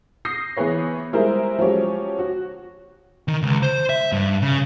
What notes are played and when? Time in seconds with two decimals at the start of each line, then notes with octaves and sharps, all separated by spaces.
0.25 D#6 G6 A#6 C7
0.57 E3 B3 G#4 B4 C#5
1.13 G3 G#3 E4 G#4 A#4 C5
1.59 F3 F#3 G#3 C#4 G4
2.19 F#4
3.28 D#3
3.42 C#2
3.63 C5
3.89 E5
4.12 G2
4.42 C#3